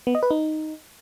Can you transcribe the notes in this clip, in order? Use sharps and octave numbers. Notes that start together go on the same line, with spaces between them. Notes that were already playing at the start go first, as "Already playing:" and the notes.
B3
D#5
B4
D#4